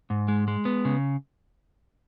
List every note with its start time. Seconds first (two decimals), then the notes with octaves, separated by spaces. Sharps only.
0.10 G#2
0.28 G#3
0.48 G#3
0.65 B3
0.85 C#3